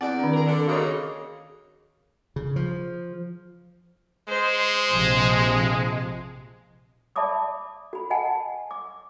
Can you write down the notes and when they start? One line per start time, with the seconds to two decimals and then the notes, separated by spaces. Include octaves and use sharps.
0.01 E2 C4 D5 F#5
0.19 D#3 D4
0.33 G#4 A#4
0.46 D3
0.67 C#3 A#3 D#4 F#4 A4 C#5
0.79 G#4
2.36 C#3
2.56 F3
4.29 G#3 C5
4.91 A#1 C3 F3
7.16 D5 E5 A5 B5 D6 D#6
7.93 F#4 B5
8.10 D#5 F#5 G#5 A5
8.71 D6